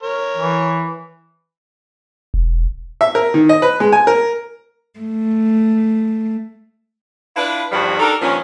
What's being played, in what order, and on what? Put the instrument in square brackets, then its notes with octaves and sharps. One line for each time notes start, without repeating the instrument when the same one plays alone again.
[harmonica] A#4 C#5
[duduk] E3
[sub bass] E1
[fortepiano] E5
A#4
D#3
D#5
B4
G#3
G#5
A#4
[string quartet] A3
[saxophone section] D4 E4 F4 B4
E2 G2 D#3 F3 G3 F#4
D4 D#4 G4 A4 A#4
G2 A#2 D#3 F3 C#4